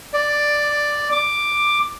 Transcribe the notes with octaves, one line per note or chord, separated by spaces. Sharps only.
D5
D6